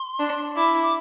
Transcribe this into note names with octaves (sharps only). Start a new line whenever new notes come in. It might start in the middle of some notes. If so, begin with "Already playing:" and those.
Already playing: C6
D4
E4 D6
D6